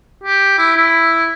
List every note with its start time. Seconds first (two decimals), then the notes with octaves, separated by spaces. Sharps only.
0.24 G4
0.58 E4
0.76 E4